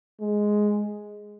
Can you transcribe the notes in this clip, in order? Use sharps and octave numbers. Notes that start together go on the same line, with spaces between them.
G#3